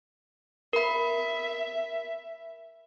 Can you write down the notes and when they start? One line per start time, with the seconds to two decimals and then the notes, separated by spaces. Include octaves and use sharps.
0.73 A#4 E5 B5